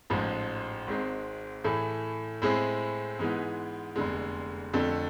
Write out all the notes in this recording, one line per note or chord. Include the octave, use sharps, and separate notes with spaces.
A1 G#2 F3 G#3
G#1 G#2 G#3 C4
A2 E3 A3 E4 G#4
A2 G#3 C4 E4 G#4
G#2 E3 G#3 B3
F1 E2 D3 G#3
F2 D3 A3